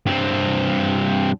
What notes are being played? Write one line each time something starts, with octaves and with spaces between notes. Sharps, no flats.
G2 C4